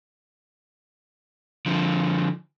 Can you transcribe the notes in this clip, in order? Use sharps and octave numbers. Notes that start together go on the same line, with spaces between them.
D3 F3